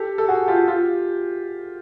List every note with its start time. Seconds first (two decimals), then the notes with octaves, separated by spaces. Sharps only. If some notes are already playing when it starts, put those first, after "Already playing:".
Already playing: G4 A4
0.18 A4
0.28 F#4 G#4
0.48 F4 G4
0.68 F4 G4